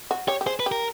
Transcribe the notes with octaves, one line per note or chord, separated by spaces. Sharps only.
F#4
G4 C#5
G4
G#4 C5
B4
G4
A#4